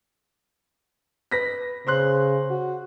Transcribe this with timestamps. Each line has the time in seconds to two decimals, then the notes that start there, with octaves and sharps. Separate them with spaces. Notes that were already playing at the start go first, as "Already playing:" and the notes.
1.31 B4 A#6 B6
1.87 C#3 C5 C6 F#6
2.51 F#4